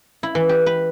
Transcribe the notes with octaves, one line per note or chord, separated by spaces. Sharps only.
E4
E3
G4
B4